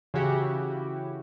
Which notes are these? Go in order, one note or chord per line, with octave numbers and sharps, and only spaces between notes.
C#3 E3 C#4 E4 F#4 G4